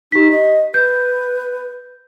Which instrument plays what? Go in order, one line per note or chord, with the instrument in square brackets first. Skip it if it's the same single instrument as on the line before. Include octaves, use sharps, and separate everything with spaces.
[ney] D#4 [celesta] G4 B6
[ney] D#5
[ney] B4 [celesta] G6